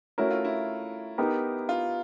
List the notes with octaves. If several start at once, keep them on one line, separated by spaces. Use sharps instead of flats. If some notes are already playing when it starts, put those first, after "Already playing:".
A3 C#4 E4 F#4 A#4 C#5
F4
E4
B3 D#4 G4 A#4
F4